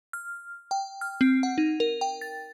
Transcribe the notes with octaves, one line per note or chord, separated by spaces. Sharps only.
F6
G5
F6
C4
F#5
D#4
A#4
G5
A6